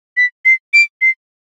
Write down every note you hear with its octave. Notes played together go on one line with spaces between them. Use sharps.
B6
C7
D7
C7